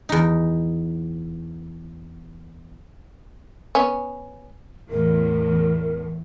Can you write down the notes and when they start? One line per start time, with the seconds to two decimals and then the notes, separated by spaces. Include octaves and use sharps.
0.09 E2 D#4
3.75 B3 C#4
4.90 E2 A2 A#4